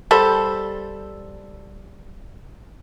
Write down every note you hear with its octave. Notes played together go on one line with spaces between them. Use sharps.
G3 A4 C5